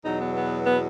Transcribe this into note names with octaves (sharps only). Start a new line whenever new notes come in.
E2 B2 F#3 D#4
B3
B3
B3